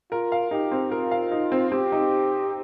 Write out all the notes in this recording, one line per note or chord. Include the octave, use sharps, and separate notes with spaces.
F4 A#4
F5
D#4 G4
C4
F4 A#4
F5
D#4
C4
C4 G4
D#4